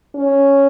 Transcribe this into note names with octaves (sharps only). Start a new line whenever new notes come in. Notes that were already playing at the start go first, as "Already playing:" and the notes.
C#4